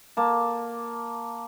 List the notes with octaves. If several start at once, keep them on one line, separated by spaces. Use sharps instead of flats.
A#3 A5